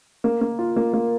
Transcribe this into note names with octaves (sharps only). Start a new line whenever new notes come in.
A#3
A#3
F4
A#3
A#3